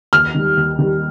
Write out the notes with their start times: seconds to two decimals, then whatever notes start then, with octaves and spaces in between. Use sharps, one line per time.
0.13 D#2 F6
0.34 D#3 G3
0.57 D#2
0.79 D#3 G3